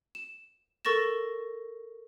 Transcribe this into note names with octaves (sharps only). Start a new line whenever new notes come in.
E7
A4 A#4 C#6 A6 A#6 E7